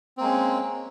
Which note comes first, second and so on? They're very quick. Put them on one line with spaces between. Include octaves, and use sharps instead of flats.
C4 A#3 G#3 C#4